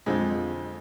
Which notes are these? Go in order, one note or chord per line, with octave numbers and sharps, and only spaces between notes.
F2 D3 G#3 C4 F4